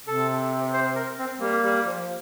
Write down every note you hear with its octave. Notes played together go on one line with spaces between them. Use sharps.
C3 A4
C5
A#4
C4
G3 A#3
G3
F3